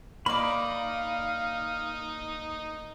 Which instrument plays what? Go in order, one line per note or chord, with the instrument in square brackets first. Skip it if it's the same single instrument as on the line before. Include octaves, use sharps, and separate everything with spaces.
[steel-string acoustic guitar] A#3 D5 [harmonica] D#4 [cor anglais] F5 [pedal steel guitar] B5 D6